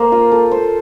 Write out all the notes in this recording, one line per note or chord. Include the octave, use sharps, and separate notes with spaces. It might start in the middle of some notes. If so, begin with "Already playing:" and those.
Already playing: A#3 C5
F4
A4
C5